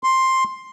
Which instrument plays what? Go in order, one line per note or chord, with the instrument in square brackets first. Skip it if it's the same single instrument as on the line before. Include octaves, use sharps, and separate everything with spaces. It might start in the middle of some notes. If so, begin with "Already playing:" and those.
[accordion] C6